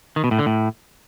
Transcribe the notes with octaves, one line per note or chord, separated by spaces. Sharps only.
D#3
B2
A2
D3
A2